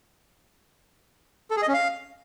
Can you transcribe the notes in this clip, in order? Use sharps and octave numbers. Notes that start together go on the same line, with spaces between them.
A4
G#4
D#5
C#4
F5